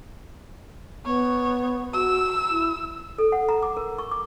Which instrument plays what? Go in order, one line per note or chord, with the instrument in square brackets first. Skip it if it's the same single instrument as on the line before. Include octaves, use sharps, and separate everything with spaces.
[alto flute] B3 [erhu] C#5
[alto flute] F#4 [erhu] E6
[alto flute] E4
[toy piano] A4
F#5
A#5
D6
A#4
C#6
D6